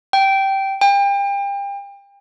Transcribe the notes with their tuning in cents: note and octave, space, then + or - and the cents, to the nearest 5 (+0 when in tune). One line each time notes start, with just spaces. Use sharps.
G5 -10
G5 +35